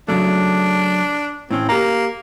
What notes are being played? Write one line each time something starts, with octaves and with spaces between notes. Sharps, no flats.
C#3 F#3 A3 D4
A2 C4 C#4
A#3 G4 A#5